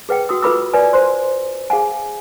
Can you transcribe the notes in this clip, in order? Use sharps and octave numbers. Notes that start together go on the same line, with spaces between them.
G#4 B4 F#5 G5
F#4 D#6 E6
F4 A4 B4 B5 D6 E6
B4 D5 G#5
C5 C6
G#4 F5 F#5 G#5